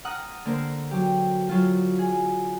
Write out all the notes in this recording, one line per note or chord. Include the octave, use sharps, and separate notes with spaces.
F#5 A#5 D#6 F6 F#6
D3 A#3 A#4 C5
F#3 G4
F#3 F4
G#4